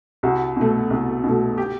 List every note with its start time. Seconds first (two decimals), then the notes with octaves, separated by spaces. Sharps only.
0.23 C2 F#4
0.57 B2 A3
0.90 C2
1.24 B2 A3
1.58 G4